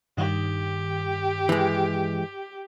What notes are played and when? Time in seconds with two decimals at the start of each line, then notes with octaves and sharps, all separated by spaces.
0.17 G2 D#3 G4
1.49 E3 G#3